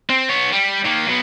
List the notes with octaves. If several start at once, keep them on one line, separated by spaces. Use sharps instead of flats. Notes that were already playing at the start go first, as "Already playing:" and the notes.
C4
B3 C#5
G3
D#3 A#3
F#3 B3